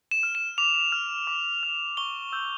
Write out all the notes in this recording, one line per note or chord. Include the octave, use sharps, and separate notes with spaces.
E7
F6
E7
D6 F7
F6
D6
F6
C#6 G7
E6 G6